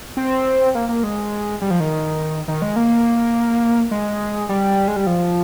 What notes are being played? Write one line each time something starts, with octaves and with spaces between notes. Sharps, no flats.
C4
A#3
A#3
G#3
G3
F3
D#3
D#3
G#3
A#3
G#3
G3
G#3
G3
F3